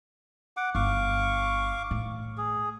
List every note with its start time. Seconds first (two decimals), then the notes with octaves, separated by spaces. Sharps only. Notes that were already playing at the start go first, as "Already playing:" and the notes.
0.57 F#5 D6
0.75 G1 F5 C#6 D6
1.91 A2
2.38 G#4